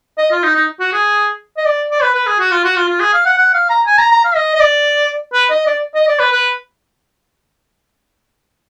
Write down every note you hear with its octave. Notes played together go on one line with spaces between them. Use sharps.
D#5
F4
D#4
D#4
F#4
G#4
D#5
D5
D5
B4
B4
G#4
F#4
F4
F#4
F4
F4
G#4
F5
F#5
F#5
F5
A#5
G#5
A#5
A#5
F5
D#5
D#5
D5
B4
D#5
D5
D#5
D5
B4
B4